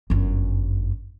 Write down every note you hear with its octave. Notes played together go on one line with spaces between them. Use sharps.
G1 F#2